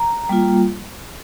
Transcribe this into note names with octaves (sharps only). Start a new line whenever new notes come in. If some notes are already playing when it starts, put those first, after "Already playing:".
Already playing: A#5
G3 A#3 F4